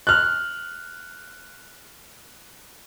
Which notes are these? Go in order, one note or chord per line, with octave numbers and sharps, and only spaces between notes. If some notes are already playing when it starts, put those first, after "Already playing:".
F6 F#6